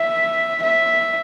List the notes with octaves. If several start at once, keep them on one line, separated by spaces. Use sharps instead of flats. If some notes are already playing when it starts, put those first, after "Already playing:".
Already playing: E5
E5